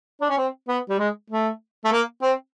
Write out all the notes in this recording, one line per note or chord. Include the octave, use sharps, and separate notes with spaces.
D4
C#4
C4
B3
G3
G#3
A3
A3
A#3
C4